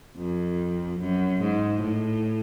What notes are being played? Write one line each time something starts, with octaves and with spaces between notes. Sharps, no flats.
F2
F#2
G#2
A2